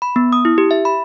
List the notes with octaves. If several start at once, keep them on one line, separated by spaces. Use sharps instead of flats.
B5
B3
D#6
E4
G4
E5
B5